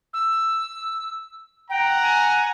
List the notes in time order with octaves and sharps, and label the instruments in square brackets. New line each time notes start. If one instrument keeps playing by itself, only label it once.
[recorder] E6
[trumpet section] F#5 A#5 [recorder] G5
[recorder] G#5